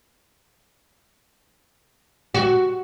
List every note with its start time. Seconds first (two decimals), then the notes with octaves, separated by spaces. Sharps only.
2.34 F#4